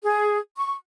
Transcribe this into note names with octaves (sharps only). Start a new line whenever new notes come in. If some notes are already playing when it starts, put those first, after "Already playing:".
G#4
C#6